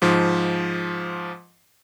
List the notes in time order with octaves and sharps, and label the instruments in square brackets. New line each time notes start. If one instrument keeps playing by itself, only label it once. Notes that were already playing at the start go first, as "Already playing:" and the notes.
[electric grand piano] G#2 F3